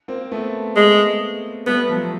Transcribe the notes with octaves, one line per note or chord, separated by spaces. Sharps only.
A#3 C4
A3 B3
G#3
G3 A3 B3
F3
F#3